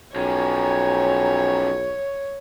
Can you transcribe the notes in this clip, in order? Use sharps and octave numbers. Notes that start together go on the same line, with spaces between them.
B1 F3 C#4 C#5 G5 G#5 A#5